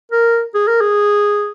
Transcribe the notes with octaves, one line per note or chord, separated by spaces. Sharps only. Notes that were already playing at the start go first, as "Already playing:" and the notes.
A#4
G#4
A#4
G#4